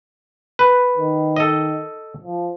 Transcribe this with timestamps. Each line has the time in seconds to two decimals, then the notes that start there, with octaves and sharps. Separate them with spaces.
0.59 B4
0.98 D#3
1.36 A4 D#5
2.23 F3